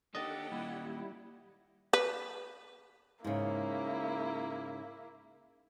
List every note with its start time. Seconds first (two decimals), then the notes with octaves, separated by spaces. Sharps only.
0.15 A#3 D4 D#4 G4 A4 D#5 F#5 A6
0.52 D#2 A#2 G3 E4
1.93 B4
3.24 G#2 C#3 A#3 E4